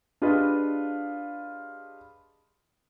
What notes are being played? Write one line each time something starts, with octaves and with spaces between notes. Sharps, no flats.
D4 F4 G4 G#4 B4 D#5